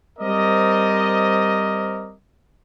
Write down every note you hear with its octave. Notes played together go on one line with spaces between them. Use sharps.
G3 C4 A#4 C5 D5 D#5